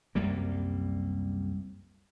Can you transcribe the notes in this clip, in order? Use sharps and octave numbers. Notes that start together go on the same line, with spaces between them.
C2 F#2 G3 A#3